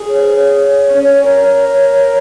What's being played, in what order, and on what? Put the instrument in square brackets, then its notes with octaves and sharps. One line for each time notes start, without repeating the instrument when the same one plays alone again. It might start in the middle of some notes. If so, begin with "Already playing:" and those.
Already playing: [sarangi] G#4
[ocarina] C#5
C5
C#5
[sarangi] C#4
A#4